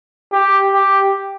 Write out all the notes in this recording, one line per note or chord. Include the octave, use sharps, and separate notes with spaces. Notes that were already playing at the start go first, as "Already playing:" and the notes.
G4
G4